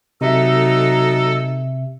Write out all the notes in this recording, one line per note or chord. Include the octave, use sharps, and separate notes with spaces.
C3 F#3 D#4 A4 E5